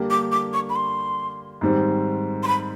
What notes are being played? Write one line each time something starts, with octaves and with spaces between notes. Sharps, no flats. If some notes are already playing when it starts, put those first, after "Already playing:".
Already playing: D3 G3 A#3 D4 G4
D6
D6
C#6
B5
C6
G#2 D#3 G3 C4
C6
B5